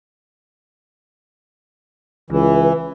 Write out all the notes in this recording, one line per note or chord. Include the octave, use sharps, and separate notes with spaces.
C#2 E3